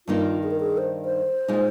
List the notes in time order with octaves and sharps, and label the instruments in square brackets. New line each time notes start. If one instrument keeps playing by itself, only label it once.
[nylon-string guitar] G2 D#3 A#3 D#4 [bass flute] F4
[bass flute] G#4
A#4
G#4
C5
C5
[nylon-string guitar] A#2 G#3 D#4